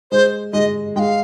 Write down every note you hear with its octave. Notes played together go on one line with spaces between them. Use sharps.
G#3 C5
G#3 D#5
G#3 F5 G5